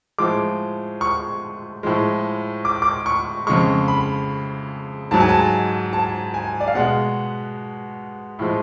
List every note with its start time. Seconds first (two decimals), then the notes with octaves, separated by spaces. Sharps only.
0.18 A2 F3 G#3 D6
1.01 C#6
1.83 A2 F3 G#3
2.65 D6
2.82 D6
3.06 C#6
3.47 F2 C#3 G#3 C#6
3.88 B5
5.11 G#2 F#3 A5
5.20 G#5
5.29 A5
5.93 A5
6.34 G#5
6.60 D5
6.68 F5
6.75 B2 G#3 F#5
8.39 A2 F3 G#3